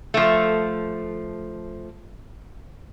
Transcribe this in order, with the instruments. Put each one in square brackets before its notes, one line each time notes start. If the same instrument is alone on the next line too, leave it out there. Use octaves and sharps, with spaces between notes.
[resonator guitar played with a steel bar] F3 A3